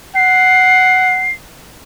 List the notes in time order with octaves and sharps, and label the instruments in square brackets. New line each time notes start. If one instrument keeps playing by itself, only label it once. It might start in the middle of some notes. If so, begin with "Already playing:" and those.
[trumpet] F#5 [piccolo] C7